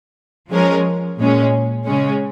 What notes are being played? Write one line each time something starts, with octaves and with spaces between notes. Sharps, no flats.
F3 G#3 C#4 A#4
A#2 G#3 C#4
C#3 G#3 C#4